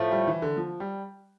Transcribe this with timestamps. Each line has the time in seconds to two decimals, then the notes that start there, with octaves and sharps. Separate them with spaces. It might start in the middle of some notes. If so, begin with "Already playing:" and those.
Already playing: A2 F3 A3
0.11 G3
0.27 E3
0.42 D3
0.57 F3
0.80 G3